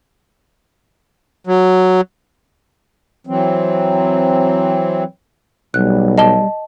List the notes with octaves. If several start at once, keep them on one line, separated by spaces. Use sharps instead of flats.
F#3
E3 F#3 C4
B1 G3 F#6
D#5 A5 G7